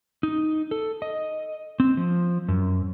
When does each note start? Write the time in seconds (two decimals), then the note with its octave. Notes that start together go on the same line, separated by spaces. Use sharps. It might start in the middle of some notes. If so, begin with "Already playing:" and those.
0.23 D#4
0.71 A4
1.02 D#5
1.80 C4
1.97 F3
2.48 F#2